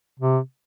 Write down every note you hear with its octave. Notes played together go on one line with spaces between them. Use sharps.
C3